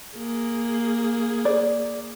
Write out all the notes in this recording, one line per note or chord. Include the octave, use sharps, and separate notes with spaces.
A#3 G#4
D5